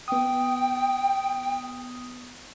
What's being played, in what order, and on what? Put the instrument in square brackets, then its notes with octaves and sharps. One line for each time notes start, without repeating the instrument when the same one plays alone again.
[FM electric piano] B3 D#6 [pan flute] G5